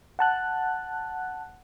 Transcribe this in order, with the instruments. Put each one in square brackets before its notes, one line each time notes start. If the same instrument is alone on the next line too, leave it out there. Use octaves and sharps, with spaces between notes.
[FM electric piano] F#5 A5 F#6